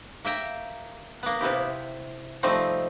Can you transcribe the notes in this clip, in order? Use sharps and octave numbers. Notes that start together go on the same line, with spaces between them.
A#3 E5 G5 A#5
A#3 B3
C3 B3 E4 G4
C3
F3 G3 A3 C4 D#4